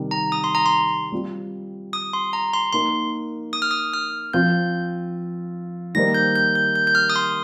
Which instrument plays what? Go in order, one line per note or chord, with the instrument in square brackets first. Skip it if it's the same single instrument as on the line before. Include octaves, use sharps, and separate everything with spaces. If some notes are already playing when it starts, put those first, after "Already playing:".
Already playing: [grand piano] C3 D#3 G3
[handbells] A#5
D#6
C6
A#5
C6
[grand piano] G3 C4 F4
[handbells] D#6
C6
A#5
C6
[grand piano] A#3 D#4 A#4 [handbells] C6
[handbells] D#6
F6
D#6
F6
[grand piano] F3 C4 F4 [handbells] G6
[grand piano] D#3 G3 A#3 D#4 C5 [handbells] A#6
[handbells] G6
G6
G6
G6
G6
F6
D#6
C6